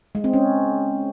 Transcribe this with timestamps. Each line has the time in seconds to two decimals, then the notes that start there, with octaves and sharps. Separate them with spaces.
0.15 G#3
0.24 C4
0.33 C#4